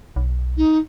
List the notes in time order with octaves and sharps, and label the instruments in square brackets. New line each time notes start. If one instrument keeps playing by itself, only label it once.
[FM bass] B1
[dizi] D#4